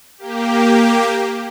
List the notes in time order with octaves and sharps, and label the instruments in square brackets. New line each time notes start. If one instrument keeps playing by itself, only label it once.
[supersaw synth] A#3 G4